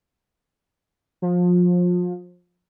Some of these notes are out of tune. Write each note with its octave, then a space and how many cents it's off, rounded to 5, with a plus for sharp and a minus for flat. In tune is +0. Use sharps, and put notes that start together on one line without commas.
F3 +30